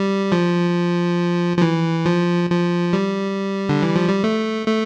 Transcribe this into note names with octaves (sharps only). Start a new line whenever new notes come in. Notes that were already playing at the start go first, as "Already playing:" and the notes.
Already playing: G3
F3
F3
E3
F3
F3
G3
D3
E3
F3
G3
A3
A3